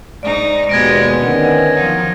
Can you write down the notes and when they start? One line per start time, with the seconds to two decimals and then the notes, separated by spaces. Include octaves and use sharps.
0.23 G#2 D#4 D5
0.69 D#2 B2 G#3 B3 G4 G#6 A#6 D7
1.20 D3 D#3 B3 C#4
1.74 D#3 F3 F#3 D#4